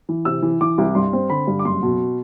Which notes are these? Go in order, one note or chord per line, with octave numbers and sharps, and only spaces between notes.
E3
C3 E6
E3
E3 D6
C2
G2 C6
C4
D3 B5
G2
D6
F#1 C6
B2